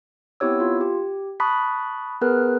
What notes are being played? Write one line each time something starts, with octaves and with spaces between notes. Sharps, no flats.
B3 C4 E4 G4 C#5 E6
F4
G4
A5 B5 C#6 D#6 F#6 B6
B3 G#4 A#4 B4 F6 F#6